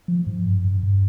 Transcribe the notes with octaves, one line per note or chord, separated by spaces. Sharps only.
F3
G#2
G2
G2
G2